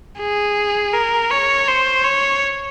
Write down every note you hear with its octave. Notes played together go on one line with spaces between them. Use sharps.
G#4
A#4
C#5
C5
C#5